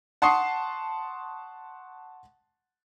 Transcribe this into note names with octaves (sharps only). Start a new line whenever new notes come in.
F#5 A5 C6 C#6 D#6 C7